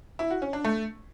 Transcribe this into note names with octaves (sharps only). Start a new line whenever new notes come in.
E4
F#4
C#4
D4
A3